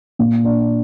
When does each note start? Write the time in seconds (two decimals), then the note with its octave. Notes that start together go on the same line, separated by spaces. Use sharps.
0.19 A#2
0.44 D4